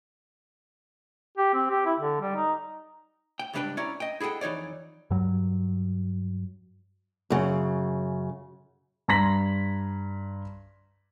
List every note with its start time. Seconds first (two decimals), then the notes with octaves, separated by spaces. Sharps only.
1.37 G4
1.54 C4
1.70 G4
1.86 E4
1.99 D3
2.21 G3
2.36 D#4
3.39 G5
3.53 C#2 G#2 G3 D4 B4 G5
3.77 C#4 E4 D5 A#5
4.00 D#5 G5
4.20 E4 G#4 A4 F#5 G5
4.41 F2 E3 D#4 C#5 D5
5.10 G2 F#3
7.30 F#2 C#3
9.08 G2 A#5 C6 A#6 B6 F#7